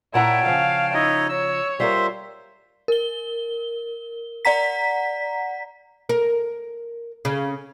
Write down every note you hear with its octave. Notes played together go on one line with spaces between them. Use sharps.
A#2 E4 C#5 F#5 G5 A5 A#5
C#3 F3 F5
D#4 E4 C#5 D#5
C#5 E6
G3 F4 A#4 C5 E5 C6
A#4 G7
D5 F#5 A#5 B6
A#4
C#3